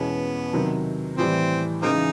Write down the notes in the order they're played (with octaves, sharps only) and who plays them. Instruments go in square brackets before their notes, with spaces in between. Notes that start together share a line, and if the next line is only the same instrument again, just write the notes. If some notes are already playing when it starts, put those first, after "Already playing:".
Already playing: [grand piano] E2 B2 G#3 C#4 [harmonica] B3
[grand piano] C3 D#3 F#3
[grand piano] A2 E3 G3 [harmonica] F3 C4
[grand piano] C#3 E3 G#3 [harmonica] A#3 C4 D#4